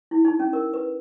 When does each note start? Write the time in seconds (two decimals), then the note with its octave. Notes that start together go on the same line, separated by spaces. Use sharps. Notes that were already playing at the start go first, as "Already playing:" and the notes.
0.11 E4
0.25 D#4
0.40 C#4
0.53 A#4
0.74 B4